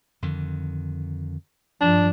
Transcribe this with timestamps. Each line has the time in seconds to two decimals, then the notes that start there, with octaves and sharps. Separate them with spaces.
0.22 F2 D3 D#3
1.81 G2 F3 D4